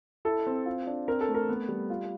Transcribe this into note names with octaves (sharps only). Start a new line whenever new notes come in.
E4 A4
C4
F4
D4
C4 A#4
A4
A3
A#4
B3
G3
F4